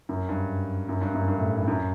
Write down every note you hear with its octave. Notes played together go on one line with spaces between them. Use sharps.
F#2
G2
F#2
G2
F#2
G2
A2
G2
F#2